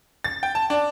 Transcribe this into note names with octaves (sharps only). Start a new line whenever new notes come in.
A6
G5
A5
D4